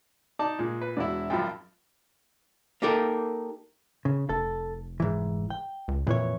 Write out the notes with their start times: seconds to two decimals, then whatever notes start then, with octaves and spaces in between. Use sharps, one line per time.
0.39 D#4 D5 A5
0.59 A#2 G#3
0.82 B4
0.97 E1 E4 F#4 D5 E5
1.30 G#1 F#2 F3 G5 B5
2.82 A#3 D#4 G4 A4 A#4
4.05 C#3
4.29 F1 A4
5.00 G#2 E3
5.50 G5
5.88 C#2
6.07 F2 A#2 E3 C#5